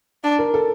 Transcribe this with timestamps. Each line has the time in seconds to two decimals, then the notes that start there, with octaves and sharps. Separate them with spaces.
0.24 D4
0.39 A#4
0.54 A4